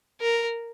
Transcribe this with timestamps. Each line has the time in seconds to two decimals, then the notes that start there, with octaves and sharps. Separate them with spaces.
0.21 A#4